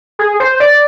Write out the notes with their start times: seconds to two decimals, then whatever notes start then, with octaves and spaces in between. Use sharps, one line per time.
0.19 G#4
0.40 C5
0.60 D5